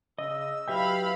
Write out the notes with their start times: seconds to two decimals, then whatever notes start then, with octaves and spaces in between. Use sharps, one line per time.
0.19 C#3 D#5 E6
0.68 F#3 E4 G4 B4 E5 F5 G5 B5